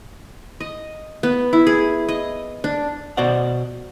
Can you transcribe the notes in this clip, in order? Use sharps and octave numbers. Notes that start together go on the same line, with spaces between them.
D#5
B3
E4
G#4
D#5
D4
B2 F#4 C5 D5 F#5